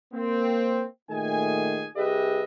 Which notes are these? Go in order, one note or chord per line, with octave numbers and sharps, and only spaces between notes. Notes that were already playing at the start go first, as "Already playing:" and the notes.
A#3 C4
A#2 D#3 A3 G#4 G#5
C2 G4 G#4 B4 D#5 E5